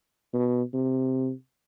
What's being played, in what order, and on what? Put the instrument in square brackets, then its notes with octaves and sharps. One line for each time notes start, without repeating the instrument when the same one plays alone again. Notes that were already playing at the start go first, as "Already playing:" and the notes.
[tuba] B2
C3